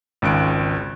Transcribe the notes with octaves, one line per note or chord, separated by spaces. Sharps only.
G#1 C#2 F#6 D7